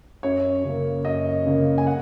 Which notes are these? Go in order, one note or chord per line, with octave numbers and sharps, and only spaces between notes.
F#2 C#5
C#3 A#3
F#2 D#5
C#3 A#3
G#5
F#5